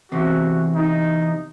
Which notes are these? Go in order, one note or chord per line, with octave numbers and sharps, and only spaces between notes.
E2 C3 F#4
D#4